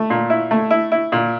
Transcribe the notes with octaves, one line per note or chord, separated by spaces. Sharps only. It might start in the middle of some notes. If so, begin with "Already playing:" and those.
Already playing: A3
A#2
E4
A3
E4
E4
A#2